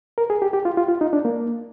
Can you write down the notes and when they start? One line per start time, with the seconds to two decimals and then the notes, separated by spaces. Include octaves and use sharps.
0.18 A#4
0.30 G#4
0.42 G4
0.53 G4
0.65 F4
0.77 F4
0.89 F4
1.01 D#4
1.13 D4
1.25 A#3